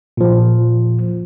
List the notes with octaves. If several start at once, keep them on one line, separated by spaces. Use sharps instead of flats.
A#2 F3